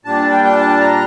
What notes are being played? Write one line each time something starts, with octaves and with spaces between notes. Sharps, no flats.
A#2 G3 D4 A5
G5
G5
A5
A#5